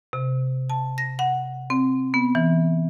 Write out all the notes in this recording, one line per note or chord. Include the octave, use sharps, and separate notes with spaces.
C3
A5
A#6
F#5
C4
B3
E3